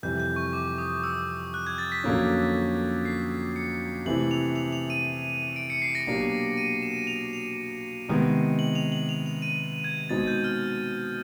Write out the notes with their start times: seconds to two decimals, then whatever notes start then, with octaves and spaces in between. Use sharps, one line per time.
0.03 F2 C3 E3 G3 G6
0.20 G6
0.36 C#6
0.53 D6
0.78 D#6
1.04 E6
1.54 F#6
1.67 G#6
1.78 A6
1.92 B6
2.04 F2 D3 F#3 A#3 C#4
3.05 C7
3.56 C#7
4.05 C3 E3 A3 C4 E4 F#7
4.31 F7
4.56 F7
4.72 F7
4.90 D#7
5.56 D7
5.70 C#7
5.82 C7
5.95 A#6
6.07 B2 F#3 A#3 D4 G4
6.58 D#7
6.82 E7
7.07 F7
7.33 F7
8.08 C3 D#3 G#3 B3
8.59 F#7
8.75 F7
8.92 F#7
9.09 F7
9.26 F7
9.42 D#7
9.84 G#6
10.09 B2 G#3 C4 D#4 A6
10.27 G6
10.44 F6